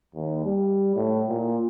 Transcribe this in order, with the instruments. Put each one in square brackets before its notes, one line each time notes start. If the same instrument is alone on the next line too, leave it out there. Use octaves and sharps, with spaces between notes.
[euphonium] D#2
G3
A2
A#2